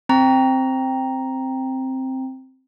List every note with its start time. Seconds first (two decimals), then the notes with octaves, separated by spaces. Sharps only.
0.09 C4 A#5